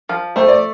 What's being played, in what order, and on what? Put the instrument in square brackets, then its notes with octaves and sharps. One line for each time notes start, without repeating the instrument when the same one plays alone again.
[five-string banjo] F3
[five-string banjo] A3 [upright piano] C5
[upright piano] D5